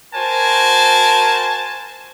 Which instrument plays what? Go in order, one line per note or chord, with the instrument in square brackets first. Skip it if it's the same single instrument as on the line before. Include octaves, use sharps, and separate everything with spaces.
[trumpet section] F#4 A#4 C5 G#5 A5